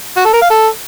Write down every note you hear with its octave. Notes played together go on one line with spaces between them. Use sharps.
F#4
A4
A#4
F5
A4